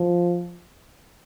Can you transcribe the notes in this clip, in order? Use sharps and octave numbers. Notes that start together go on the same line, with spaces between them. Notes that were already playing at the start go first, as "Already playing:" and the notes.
Already playing: F3